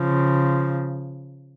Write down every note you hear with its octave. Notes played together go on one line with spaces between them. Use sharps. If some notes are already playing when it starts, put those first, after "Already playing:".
Already playing: C#3 F3